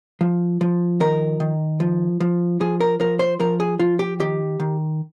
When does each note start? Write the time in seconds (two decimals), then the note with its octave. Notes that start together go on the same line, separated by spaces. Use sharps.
0.21 F3
0.61 F3
1.00 D#3 A#4
1.40 D#3
1.80 F3
2.20 F3
2.61 F3 G#4
2.80 A#4
3.00 F3 A#4
3.19 C5
3.40 F3 A#4
3.60 G#4
3.79 F3 F4
3.99 G4
4.20 D#3 G4
4.60 D#3